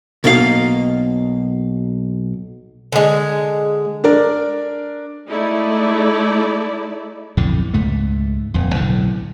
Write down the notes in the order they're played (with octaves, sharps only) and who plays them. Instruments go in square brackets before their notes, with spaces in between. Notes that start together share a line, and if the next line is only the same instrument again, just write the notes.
[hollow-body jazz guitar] B1 B2 A#3 D#4 A4 F5
[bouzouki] D3 G#3
[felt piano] D4 A#4 D5
[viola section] G#3 A3 D#4 E4 D5
[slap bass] B1 F2 A2 D3
C#2 G#2 A3
D#1 F2
B1 A2 D3